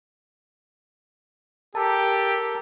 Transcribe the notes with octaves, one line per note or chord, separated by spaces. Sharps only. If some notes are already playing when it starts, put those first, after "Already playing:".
G4 A4 A#4 A5